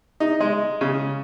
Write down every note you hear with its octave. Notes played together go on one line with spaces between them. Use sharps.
D#4
G#3
C#3